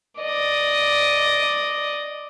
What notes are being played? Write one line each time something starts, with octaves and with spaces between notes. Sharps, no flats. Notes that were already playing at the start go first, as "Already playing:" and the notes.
D5 D#5